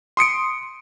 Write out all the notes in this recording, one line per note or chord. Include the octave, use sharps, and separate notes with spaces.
C6 D#6 C#7 D7